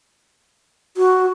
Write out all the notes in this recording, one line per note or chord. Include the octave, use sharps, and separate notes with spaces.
F#4